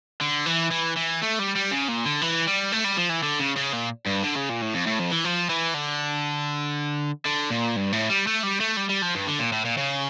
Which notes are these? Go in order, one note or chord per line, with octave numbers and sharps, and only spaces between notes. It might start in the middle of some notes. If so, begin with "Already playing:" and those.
D3
E3
E3
E3
A3
G3
G3
C#3
A#2
D3
E3
G3
A3
G3
F3
E3
D3
C#3
C#3
A#2
G2
D3
C#3
A#2
A2
F2
A2
F2
E3
F3
E3
D3
D3
A#2
G2
A2
G3
A3
G3
A3
G3
G3
F3
G2
D3
A#2
A2
A#2
C#3